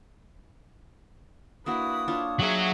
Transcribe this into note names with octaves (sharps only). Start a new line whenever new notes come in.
A#3 D4 E4 F#4 B4 D#6
D4 F4 C#5
F#3 F#4 G#4 E5